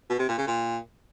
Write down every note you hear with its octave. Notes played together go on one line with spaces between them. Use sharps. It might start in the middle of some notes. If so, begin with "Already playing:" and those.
B2
C3
A#2
C#3
A#2